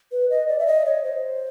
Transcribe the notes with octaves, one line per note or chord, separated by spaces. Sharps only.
B4
D#5
D5
E5
D#5
C#5
C5